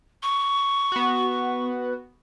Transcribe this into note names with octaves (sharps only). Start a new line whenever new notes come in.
C#6
B3 F#4